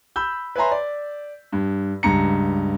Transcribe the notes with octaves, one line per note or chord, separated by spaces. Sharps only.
B5 E6 G6
B4 C#5 E5 G#5 A#5 C6
D5
G2
C#2 G2 A#5 C#7